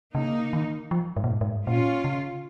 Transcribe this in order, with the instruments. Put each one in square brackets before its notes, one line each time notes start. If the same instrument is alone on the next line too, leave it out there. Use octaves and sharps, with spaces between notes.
[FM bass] C#3 [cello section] A#3 D#4
[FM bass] D#3
F3
G#2
A#2
G#2
G#2
[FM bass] A#2 [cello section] C#4 F4
[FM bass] C#3